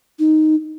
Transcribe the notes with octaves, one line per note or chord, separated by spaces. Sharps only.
D#4